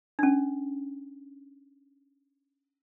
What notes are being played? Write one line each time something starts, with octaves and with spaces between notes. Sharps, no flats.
C#4 D4